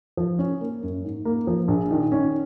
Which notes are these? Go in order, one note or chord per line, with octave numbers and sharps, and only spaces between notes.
F3
C#4
A#3
F#2
G#2
A#3
F3
A#1
D#3
C#4